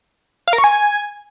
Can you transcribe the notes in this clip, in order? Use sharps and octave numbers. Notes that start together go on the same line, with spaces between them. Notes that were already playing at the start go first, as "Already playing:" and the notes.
F5
A#4
C#6
G#5